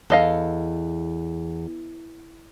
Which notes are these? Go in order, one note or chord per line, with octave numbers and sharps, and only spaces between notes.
E2 A4 D#5 F5